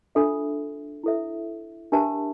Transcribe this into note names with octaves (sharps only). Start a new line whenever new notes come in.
D4 F4 A4 E5
E4 A4 E5
D4 G4 A#4 E5 A5